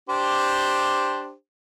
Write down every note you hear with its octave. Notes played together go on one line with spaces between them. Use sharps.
D4 G4 C5